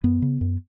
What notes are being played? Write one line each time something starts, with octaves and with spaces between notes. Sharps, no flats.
F#2 B3
C#3
F#2